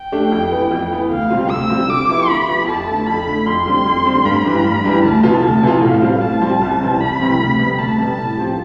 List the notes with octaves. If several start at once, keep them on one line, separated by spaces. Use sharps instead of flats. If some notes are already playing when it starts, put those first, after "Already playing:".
Already playing: G5
A3 D4 G4
F2
E3 B3
F2
E3 B3
D2 F5
C3 G3 C4 F4
D2 E6
C3 G3 C4 F4
D3 D6
F3 B3 E4 G4
D3 B5
F3 B3 E4 G4
F2 A5
D3 A3
F2 B5
D3 A3
F2 C6
D3 G3 C4
F2
D3 G3 C4
G2 B5
E3 G3 D4
G2
E3 G3 D4
D2 A5
C3 E3 B3 F4
D2
C3 E3 B3 F4
A2 F5
G3 C4 F4
A2 A5
G3 C4 F4
C2
C3 E3 G3 C4
C2 B5
C3 E3 G3 C4
D2
C3 G3 B3
D2 A5
C3 G3 B3
A2
F3 C4 G4